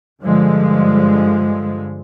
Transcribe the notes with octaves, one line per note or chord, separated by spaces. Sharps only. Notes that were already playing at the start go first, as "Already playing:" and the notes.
G2 D3 F3 G#3